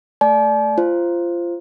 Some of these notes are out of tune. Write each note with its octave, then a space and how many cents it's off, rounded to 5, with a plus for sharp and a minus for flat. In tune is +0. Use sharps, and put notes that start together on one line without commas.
A3 +0 D5 +0 A5 -45
F4 -20 C5 +0